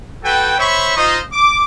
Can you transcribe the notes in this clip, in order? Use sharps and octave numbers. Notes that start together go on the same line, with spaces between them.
F#4 A4 B4 G5
C5 C#5 E5 B5 C#6
D#4 F4 C5 D#5
D6